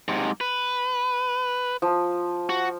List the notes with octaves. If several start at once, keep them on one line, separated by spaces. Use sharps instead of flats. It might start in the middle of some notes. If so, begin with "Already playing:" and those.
G#2 C3
B4
F3
F#4